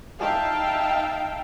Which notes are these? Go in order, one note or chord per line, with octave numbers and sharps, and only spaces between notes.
D#4 E5 F5 G5 A5